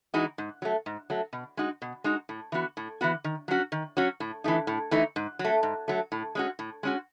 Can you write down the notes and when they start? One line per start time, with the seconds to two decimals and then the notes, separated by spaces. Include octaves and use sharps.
0.14 E3 G#3 D#4 F#4
0.38 G#2
0.62 F#3 A3
0.86 G#2
1.10 F#3 A3
1.33 B2
1.57 G#3 D#4 F#4
1.82 B2
2.04 G#3 D#4 F#4
2.29 A2
2.52 E3 B3 F#4
2.77 A2
3.01 E3 B3 F#4
3.24 D#3
3.48 F#3 C#4 F#4
3.72 D#3
3.97 F#3 C#4 F#4
4.20 A2
4.44 E3 A3 D#4
4.67 A2
4.91 E3 A3 D#4
5.16 G#2
5.39 F#3
5.44 A3
5.63 G#2
5.88 F#3 A3
6.12 A2
6.35 G#3 C#4 F#4
6.59 A2
6.83 G#3 C#4 F#4